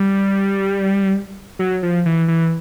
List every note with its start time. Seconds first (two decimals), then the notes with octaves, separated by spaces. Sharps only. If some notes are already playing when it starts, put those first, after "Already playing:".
Already playing: G3
1.59 F#3
1.83 F3
2.06 E3
2.28 E3